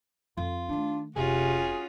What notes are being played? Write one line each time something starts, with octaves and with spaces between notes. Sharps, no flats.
F2 F4
D#3 A3 D4
F1 C3 C#4 F4 F#4 G#4